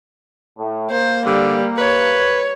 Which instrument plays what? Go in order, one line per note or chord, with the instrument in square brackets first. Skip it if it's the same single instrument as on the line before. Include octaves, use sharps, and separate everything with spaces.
[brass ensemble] A2
[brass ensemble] A#3 [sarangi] C5
[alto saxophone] D3 [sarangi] G3
[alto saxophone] B4 [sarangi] C#5